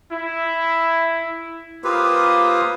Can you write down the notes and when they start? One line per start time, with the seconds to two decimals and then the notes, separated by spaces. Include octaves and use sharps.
0.12 E4
1.84 A#3 F4 G4 B4 C5 D#6